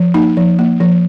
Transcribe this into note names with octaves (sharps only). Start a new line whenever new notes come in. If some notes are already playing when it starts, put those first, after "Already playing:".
Already playing: F3
A#3 D#4
F3
A#3
F3